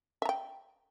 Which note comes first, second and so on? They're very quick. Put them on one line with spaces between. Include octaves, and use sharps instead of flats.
E5 A#5 G5